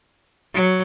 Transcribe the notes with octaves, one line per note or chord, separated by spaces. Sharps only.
F#3